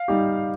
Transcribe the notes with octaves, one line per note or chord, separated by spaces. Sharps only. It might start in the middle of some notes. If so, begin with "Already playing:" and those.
Already playing: F5
G3 D#4 G4